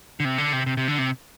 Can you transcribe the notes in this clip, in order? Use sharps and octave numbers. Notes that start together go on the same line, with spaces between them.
D3
C3
D3
C3
C3
C3
D3
C3